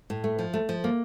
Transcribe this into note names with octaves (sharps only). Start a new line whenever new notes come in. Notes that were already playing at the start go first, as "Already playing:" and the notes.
A2
A3
F3
A3
F3
A#3